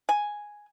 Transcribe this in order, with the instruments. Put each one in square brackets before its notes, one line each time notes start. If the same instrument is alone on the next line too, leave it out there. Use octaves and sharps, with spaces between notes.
[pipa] G#5